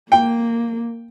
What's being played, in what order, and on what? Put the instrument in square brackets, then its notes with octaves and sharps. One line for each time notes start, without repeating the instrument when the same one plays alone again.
[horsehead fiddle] A#3 [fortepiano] G5